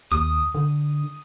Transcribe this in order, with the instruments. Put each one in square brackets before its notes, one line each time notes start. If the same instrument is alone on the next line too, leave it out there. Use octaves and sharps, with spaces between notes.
[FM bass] D#2 [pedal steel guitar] D#6
[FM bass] D3